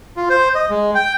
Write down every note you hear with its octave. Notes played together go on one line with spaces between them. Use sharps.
F4
C5
D#5
G#3
G5